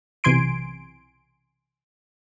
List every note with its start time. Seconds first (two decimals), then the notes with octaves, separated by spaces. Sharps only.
0.24 B1 C3 E3 G#5 C6 D7